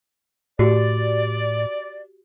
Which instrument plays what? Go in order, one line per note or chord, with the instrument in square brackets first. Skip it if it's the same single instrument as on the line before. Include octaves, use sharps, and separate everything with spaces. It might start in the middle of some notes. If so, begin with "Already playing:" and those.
[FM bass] A2 [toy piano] F#4 G4 [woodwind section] D5